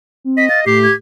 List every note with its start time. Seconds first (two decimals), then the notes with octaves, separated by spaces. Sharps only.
0.24 C4
0.37 D#5 B6
0.49 F5 A6
0.66 A2 G4 C7
0.83 G#6